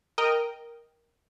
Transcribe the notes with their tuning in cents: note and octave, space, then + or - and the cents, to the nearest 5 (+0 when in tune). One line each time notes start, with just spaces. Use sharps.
A#4 +0 D#5 +0 G5 +0